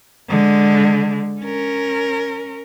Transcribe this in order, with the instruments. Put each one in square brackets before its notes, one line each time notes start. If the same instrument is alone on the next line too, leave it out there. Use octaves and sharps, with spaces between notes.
[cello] D3 G#3
C#4 A#4